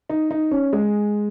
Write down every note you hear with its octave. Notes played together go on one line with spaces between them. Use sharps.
D#4
D#4
C#4
G#3